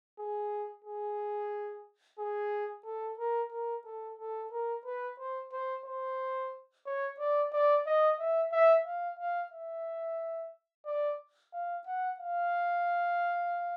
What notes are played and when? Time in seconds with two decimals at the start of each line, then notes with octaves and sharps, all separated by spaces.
0.19 G#4
0.85 G#4
2.19 G#4
2.85 A4
3.19 A#4
3.52 A#4
3.85 A4
4.19 A4
4.52 A#4
4.86 B4
5.19 C5
5.53 C5
5.85 C5
6.86 C#5
7.19 D5
7.52 D5
7.86 D#5
8.19 E5
8.52 E5
8.86 F5
9.19 F5
9.52 E5
10.86 D5
11.53 F5
11.87 F#5
12.20 F5